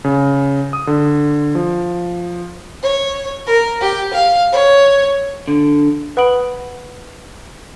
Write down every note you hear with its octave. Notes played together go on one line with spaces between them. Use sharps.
C#3
D#6
D3
F3
C#5
A#4
G4
F5
C#5
D3
B4 F#5 B5 D#6 D7 F#7